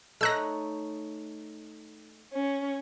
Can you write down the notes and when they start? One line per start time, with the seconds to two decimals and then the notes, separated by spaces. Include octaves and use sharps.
0.21 A3 D#4 C#5 E6 F#6 A#6
2.34 C#4